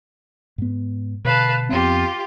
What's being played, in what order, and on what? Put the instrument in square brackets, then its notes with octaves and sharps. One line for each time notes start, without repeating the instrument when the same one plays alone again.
[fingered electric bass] G#2 B3
[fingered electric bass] B2 D3 [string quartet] B4 F5 A5
[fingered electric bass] F2 B3 C4 [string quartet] F4 G4